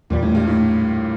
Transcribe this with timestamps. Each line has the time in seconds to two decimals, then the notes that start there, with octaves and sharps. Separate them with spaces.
0.10 E2 A#2 E3 G3
0.23 A2
0.35 G2
0.47 A2